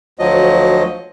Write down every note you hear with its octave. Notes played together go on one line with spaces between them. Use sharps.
D2 F3 F#3 D#5